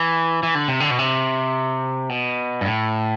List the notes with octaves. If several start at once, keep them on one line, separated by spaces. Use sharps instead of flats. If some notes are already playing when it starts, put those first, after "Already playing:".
Already playing: E3
E3
D3
C3
D3
B2
C3
B2
G2
A2